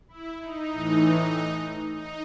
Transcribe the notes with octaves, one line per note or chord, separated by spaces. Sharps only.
E4
D#4
A2 E3
D#4